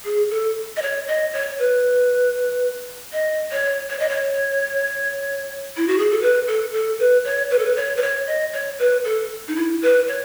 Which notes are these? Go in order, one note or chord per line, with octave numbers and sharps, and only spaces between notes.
G#4
A4
D#5
C#5
D#5
C#5
B4
D#5
C#5
C#5
D#5
C#5
E4
F#4
G#4
A4
B4
A4
A4
B4
C#5
B4
A4
B4
C#5
B4
C#5
D#5
C#5
B4
A4
D#4
E4
B4
C#5